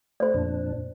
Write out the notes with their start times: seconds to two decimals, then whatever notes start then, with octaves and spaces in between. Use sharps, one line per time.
0.20 A3 C5 D5
0.34 F2 A#2 D4